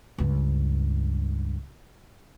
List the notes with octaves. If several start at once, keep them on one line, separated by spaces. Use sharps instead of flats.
C#2 G2